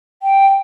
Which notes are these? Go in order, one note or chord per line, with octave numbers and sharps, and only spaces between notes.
G5